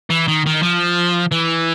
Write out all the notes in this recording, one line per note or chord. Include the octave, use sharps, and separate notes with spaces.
E3
D#3
D#3
F3
E3